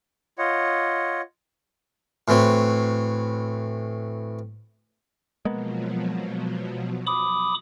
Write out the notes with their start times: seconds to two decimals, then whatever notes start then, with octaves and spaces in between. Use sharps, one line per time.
0.39 F4 C#5 D#5 F#5
2.28 A2 E3 C4 F#4
5.45 B2 F3 F#3 G#3 A#3 B3
7.07 B5 D6 D#6